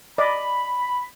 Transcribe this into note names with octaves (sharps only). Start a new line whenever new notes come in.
D5 D#5 B5